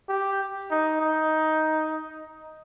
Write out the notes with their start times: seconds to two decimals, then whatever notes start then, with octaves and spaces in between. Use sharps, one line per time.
0.09 G4
0.71 D#4
1.01 D#4